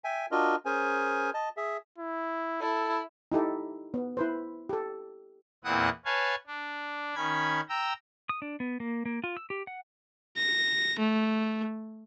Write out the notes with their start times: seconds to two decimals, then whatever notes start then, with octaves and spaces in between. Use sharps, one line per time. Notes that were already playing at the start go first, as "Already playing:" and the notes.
0.04 E5 G5 G#5
0.32 D4 F4 F#4 A#4 D#5
0.66 C#4 G#4 A#4 C5 G#5
1.34 D#5 A5
1.57 G#4 E5
1.98 E4
2.62 E4 A4
3.32 D#4 E4 G4 A4
3.94 B3
4.17 E4 B4 C5
4.69 G4 A4
5.64 E2 A#2 C4 E4 F#5 D#6
6.05 B4 C#5 F5 G#5 A5
6.47 D4
7.15 D#3 C#4 B5 G#6
7.69 G5 A#5 E6
8.29 D#6
8.42 D4
8.60 B3
8.80 A#3
9.05 A#3
9.24 F4
9.37 E6
9.50 G4
9.67 F#5
10.37 A#6
10.99 A3